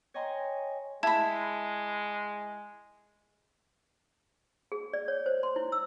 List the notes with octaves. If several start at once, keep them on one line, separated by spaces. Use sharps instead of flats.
C#5 D#5 G5 G#5 A#5 C6
G#3 E4 A5 B5 G#6
G#4
D5
C#5
C5
C6
E4
E6